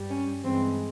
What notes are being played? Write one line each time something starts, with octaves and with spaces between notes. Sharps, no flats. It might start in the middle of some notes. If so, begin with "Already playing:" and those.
Already playing: G2 G3
C#4
G2 E3 G#3 C4